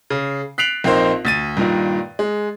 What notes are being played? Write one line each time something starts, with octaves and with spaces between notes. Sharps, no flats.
C#3
F#6 B6 C7 D7 F7 F#7
A#1 C4 D#4 A#4 C5
D2 A6 D#7
G2 A#2 D#3
G#3